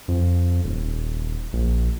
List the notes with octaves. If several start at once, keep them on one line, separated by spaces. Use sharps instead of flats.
F2
D#1
A#1